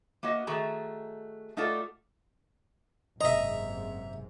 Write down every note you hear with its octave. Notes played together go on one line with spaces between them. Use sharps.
A#3 B3 F#4 D#5
D#3 A3 F#4 G#4 A#5
A3 D#4 F4 F#4 A4 D5
F#1 G#2 C3 D#5 E5 A#5